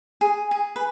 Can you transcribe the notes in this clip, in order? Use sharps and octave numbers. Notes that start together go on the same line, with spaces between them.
G#4
G#4
B4